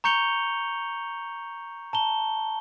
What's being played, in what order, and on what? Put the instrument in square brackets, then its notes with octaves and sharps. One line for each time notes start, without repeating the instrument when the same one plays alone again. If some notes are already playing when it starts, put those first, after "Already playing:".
[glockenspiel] A#5 C#6 G6 C#7 F7 G7
A5 A#5 G7